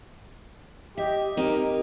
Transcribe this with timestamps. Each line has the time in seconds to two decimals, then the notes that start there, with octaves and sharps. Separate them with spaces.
0.98 G4 D#5 E5
1.37 A#3 C4 D#4 G4 A#4